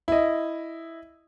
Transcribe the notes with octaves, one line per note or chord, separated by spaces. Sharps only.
E4 D#5